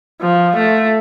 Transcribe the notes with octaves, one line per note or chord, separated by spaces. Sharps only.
F3
A3